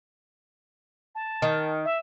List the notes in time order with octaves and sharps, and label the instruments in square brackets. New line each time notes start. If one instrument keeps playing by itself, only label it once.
[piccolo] A5
[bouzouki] D#3
[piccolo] E5